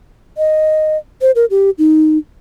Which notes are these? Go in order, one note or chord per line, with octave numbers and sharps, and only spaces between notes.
D#5
C5
A#4
G4
D#4